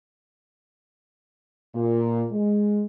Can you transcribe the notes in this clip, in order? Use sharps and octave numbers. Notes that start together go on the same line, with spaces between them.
A#2
G#3